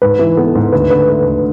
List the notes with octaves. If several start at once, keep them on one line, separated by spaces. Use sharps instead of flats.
G#2 B4
E3
B3 A4
G#2
D2 B4
D3 B4
A3
D2